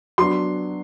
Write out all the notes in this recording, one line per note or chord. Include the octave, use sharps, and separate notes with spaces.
F#3 B3 D4 C6